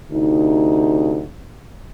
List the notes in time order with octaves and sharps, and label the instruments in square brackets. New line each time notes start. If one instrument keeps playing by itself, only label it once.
[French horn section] D2 C3 D#4